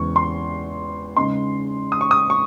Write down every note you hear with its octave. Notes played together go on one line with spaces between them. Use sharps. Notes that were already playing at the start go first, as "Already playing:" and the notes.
Already playing: E2 C#3 G#3 C#6
C6
C#3 G#3 D#4 C6
D#6
C#6
D#6
C#6